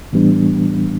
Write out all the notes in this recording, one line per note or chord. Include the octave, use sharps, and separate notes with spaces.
A2 E3 G3 B3 D4